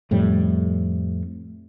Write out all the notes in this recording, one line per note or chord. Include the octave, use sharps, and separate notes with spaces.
F2 A2 G3